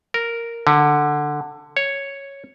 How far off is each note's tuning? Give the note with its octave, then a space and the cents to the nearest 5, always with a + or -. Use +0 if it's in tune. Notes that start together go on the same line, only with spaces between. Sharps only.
A#4 -5
D3 +10
C#5 +0